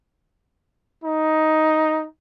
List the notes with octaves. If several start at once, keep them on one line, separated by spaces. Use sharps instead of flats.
D#4